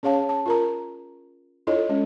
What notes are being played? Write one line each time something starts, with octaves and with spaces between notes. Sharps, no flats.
C#4 G#4 C#5 F5 A5
A5
F4 A#4 A#5
D4 E4 F4 A4 C#5 D#5
G#3 C#4